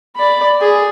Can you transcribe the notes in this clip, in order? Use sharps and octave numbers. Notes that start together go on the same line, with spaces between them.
D5 B5
G#4